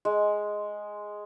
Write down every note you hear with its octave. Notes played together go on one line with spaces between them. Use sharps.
G#3